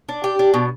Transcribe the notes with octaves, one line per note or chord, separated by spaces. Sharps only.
D4
G4
D4
B2